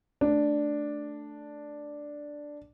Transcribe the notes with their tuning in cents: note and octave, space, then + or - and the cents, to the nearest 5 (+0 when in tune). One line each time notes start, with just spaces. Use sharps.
A3 +0 D4 +0